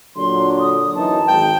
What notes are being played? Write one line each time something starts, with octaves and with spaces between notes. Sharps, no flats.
A#2 D3 F#3 C6
D#6
F#2 E3 D#4 A5
G#1 G5